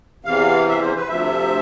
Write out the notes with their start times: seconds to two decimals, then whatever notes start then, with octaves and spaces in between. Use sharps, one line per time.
0.25 E2 C3 E3 F5
0.68 E5
0.82 C5
0.96 B4
1.09 D2 C3 F3 E5